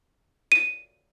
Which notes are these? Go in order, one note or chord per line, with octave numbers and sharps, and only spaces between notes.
D#7